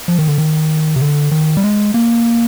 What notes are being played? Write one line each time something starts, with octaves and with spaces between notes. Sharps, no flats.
F3
D#3
D3
D#3
C3
D3
D#3
G3
G#3
A#3